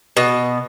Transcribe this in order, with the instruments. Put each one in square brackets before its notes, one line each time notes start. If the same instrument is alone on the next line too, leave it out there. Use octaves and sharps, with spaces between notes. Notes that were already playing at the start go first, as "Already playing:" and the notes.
[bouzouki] B2